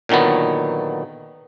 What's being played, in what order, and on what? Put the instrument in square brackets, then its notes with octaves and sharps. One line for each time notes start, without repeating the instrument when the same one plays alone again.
[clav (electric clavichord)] A#2 D3 D#3 F#3 B3